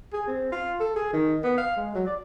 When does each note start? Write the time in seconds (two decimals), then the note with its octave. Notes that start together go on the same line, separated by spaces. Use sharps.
0.13 G#4
0.28 C4
0.52 F4
0.80 A4
0.96 G#4
1.13 D#3
1.44 B3
1.58 F5
1.77 G#3
1.95 F#3
2.07 D5